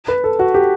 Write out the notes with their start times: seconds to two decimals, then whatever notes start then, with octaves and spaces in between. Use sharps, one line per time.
0.08 B4
0.24 A4
0.39 F#4
0.54 G4